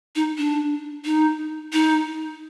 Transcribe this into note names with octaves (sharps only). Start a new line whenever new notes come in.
D#4
D4
D#4
D#4